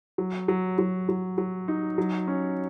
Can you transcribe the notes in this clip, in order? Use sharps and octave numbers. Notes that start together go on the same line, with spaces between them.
F#3
F#3
F#3
F#3
F#3
D#4
F#3
C#4